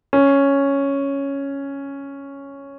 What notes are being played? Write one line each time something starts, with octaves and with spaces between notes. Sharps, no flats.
C#4